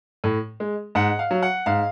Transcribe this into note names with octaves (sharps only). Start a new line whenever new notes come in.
A2
G#3
G#2 F#5
F5
F#3
F#5
G#2 F5